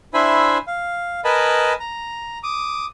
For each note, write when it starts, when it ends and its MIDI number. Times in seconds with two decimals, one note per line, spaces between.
0.14 0.58 62
0.14 0.58 64
0.14 0.58 72
0.14 0.58 76
0.14 0.58 80
0.14 0.58 83
0.67 1.21 77
1.24 1.73 70
1.24 1.73 71
1.24 1.73 75
1.24 1.73 80
1.24 1.73 81
1.24 1.73 83
1.80 2.38 82
2.43 2.86 86
2.43 2.86 87